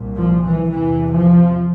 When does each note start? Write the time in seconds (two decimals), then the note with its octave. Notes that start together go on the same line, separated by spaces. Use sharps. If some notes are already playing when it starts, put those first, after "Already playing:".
Already playing: C2 A#2
0.16 F3
0.44 E3
0.72 E2 C3 E3
1.14 F3